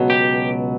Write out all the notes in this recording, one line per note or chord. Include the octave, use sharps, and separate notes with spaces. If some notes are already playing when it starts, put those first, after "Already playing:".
Already playing: C#2 B2 F#3
G4